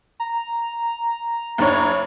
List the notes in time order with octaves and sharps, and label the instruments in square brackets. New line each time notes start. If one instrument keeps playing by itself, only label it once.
[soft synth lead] A#5
[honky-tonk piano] F#1 D4 C#5